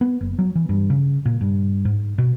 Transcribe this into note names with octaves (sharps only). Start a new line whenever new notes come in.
B3
F#1
F#3
E3
G2
C#3
A#2
G2
G#2
B2